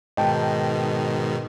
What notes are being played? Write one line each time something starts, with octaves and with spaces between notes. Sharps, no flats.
G#2 B2 D#3 D#5 G5 A5